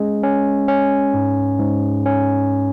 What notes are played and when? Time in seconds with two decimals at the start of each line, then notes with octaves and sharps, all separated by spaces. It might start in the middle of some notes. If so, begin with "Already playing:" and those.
Already playing: G#3 C#4
0.23 C#4
0.68 C#4
1.14 G#2
1.60 G#2
2.06 C#4